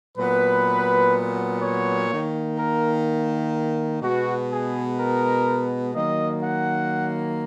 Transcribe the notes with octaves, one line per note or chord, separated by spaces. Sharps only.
A#2 F#3 B3 B4
C#5
D#3 A#3
A#4
B2 G#3 B3 F#4
G#4
A#4
D#3 F#3 A#3 D#5
F#5